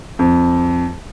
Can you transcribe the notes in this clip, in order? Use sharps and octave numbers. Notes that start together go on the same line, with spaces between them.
F2